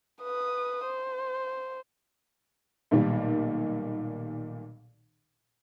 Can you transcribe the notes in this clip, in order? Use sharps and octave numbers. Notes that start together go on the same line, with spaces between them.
B4 D#6
C5
B1 A#2 D#3 G3